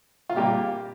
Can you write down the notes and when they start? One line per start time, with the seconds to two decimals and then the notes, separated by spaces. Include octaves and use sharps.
0.29 F4
0.36 A#2 G3 A#3 G4